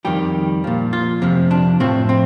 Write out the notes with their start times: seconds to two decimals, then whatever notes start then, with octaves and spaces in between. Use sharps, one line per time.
0.05 F2 D#3 G3 G4
0.64 A#2 F3
0.93 F4
1.22 F2 C3 F3
1.51 D4
1.80 A2 F3 C4
2.09 C4